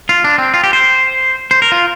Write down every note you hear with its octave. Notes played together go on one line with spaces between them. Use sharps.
F4
D4
C4
F4
G4
C5
C5
A#4
F4